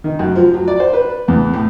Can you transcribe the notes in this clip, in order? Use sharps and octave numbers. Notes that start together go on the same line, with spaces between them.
D#3
F#2
F3
F#3
D5
C5
B4
E2
A2